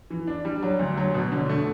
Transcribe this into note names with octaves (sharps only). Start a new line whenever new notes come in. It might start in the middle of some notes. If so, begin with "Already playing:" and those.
E3
D4
G3
F#3
D2
F#3
B2
D3
A3